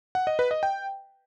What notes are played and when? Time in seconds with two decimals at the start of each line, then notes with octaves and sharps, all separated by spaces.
0.15 F#5
0.27 D#5
0.39 B4
0.51 D#5
0.63 G5